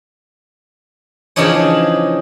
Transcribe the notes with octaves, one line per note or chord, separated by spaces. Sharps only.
C#3 E3 F3 D4 D#4 C#5